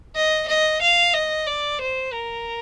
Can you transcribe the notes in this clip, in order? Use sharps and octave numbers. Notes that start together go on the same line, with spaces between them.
D#5
D#5
F5
D#5
D5
C5
A#4